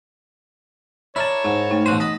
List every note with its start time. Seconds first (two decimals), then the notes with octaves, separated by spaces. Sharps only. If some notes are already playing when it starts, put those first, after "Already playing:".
1.16 E4 A#4 C#5 D5 A5
1.44 G#2 D#4
1.71 A3 D#4
1.86 A1 B2 F#4 C5 D#6
2.00 D#5 A5 B5